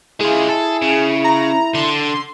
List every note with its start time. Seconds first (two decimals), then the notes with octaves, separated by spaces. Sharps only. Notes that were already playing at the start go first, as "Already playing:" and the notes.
0.21 G#3 E4 F4 G#4
0.49 A4
0.82 C#3
1.24 A#5
1.75 D3 C6